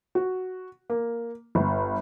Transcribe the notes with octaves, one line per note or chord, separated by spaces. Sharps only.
F#4
A#3
G1